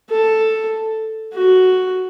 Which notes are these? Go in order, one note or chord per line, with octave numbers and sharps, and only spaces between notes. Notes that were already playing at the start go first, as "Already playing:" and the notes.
A4
F#4